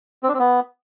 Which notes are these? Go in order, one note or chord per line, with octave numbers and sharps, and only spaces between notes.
C4
D4
C4
B3